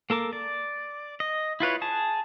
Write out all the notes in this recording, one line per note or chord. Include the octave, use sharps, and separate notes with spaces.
A#3 A4 A#4 D6
D5
D#5
E4 F4 B4 C#5
G#4 A5